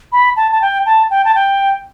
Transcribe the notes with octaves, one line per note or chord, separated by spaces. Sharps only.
B5
A5
A5
G5
A5
G5
A5
G5